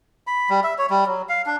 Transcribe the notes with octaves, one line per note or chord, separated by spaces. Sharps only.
B5
G3
E5
C#5
G3
F#3
F5
D4